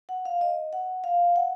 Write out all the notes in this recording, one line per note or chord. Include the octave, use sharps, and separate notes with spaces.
F#5
F5
D#5
F#5
F5
F#5